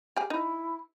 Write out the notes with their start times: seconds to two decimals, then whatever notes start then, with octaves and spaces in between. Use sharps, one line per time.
0.17 G4 G#4
0.30 D#4 E4